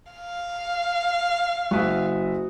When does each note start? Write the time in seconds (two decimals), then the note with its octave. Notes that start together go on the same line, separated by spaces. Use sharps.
0.12 F5
1.71 F#1 F#4 E5 D#6